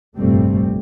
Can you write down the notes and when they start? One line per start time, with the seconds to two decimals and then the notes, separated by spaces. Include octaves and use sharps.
0.17 F1 A#1 G2 G3 A3 C4